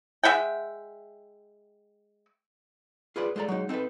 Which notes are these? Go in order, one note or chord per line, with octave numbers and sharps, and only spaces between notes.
G#3 E5 F#5 G5
F4 G#4 B4 C5 D5
G#3 D#4 A4 D5 A#5
F#3 G#3 D#4
C4 D#4 F4 A4 B4